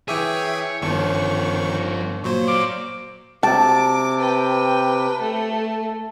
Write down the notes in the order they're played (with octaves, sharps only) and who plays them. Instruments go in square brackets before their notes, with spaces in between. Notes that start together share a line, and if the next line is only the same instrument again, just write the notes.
[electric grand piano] E3 D6 D#7 [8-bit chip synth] G#4 E5 G5 [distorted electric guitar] C#5
[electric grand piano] G1 C#5 A5 [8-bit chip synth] D#3 C#6 [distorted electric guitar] F3 C#4
[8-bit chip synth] A#2 F#3 C5 [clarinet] A#3 [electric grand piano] C#6
[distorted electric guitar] D5 F5 [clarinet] D6
[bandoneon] C3 [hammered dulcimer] A5 [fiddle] D6
[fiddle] B4 G5
A3